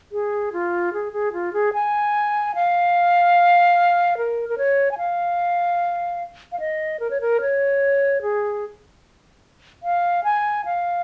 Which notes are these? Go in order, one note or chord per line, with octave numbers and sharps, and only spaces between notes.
G#4
F4
G#4
G#4
F4
G#4
G#5
F5
A#4
A#4
C#5
G#5
F5
F5
D#5
A#4
C#5
A#4
C#5
G#4
F5
G#5
F5